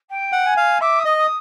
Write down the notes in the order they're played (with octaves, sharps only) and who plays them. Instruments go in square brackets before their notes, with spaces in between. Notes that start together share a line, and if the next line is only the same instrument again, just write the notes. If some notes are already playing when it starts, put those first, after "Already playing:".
[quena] G5
[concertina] F#5
[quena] G#5
[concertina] F5
[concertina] E5 [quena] D6
[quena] D#6
[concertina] D#5
[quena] D#6